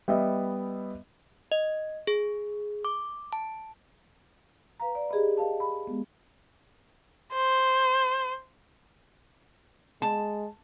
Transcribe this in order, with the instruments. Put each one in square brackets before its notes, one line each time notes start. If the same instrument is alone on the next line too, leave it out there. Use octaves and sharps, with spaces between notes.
[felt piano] G3 B3 D#5 E5
[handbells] D#5
G#4
D6
A5
[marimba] B4 F5 A#5
D5
G4 G#4 B4 D#5 B5
A#4 D#5 F5 A5
B5
G#3 B3
[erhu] C5
[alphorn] G#3 [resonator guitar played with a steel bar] A5